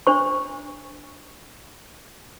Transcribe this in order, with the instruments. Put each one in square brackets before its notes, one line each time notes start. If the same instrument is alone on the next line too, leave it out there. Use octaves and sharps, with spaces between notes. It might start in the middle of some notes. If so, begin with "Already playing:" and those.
[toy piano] D4 C5 C#6